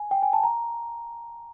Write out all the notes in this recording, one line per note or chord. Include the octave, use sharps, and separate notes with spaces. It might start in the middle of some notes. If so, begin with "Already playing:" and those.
Already playing: G#5
G5
G#5
A5
A#5